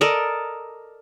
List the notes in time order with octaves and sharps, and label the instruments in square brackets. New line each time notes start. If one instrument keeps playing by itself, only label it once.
[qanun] A4 A#4 D5 D#5